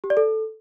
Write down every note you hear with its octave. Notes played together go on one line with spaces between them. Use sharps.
G4
D5
A4